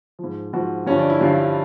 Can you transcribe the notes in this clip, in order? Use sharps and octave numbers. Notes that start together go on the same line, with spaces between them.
G#2 F3
G#2 F3 F#4
G2 D3 F3 C#4
D4
E4
G2 D3 F3 F4